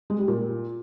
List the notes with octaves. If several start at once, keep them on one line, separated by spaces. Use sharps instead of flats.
G#3
G3
A#2